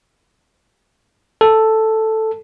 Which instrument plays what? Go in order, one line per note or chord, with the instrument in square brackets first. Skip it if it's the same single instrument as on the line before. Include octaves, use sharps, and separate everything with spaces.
[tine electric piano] A4